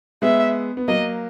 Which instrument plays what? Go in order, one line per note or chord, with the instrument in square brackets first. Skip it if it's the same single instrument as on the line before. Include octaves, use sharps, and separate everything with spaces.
[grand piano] G#3 B3 [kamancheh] E5
[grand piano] B3
[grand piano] F#3 A#3 [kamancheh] D#5